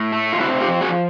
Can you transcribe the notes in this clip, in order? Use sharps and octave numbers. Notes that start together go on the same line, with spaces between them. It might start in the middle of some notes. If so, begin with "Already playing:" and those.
Already playing: A2
A3
F4
C4 E4 F#4
F4 G4
F3
F#4 G#4